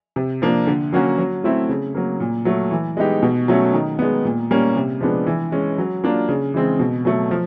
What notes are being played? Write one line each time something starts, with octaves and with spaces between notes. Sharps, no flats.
C3
F3 A#3 D4
D3
F#3 A#3 C#4 F#4
F#3
A3 C4 E4
C#3
F#3 A#3
A#2
F#3 A3
E3
G#3 B3 D#4 G4
B2
F#3 A3 C#4
D#3
G#3 B3
A#2
G3 A#3 C#4
C3
F3 G#3 B3 D4
E3
G#3 C#4
F#3
A#3 D4 F4
C#3
E3 G#3 C4
B2
F#3 A3
F3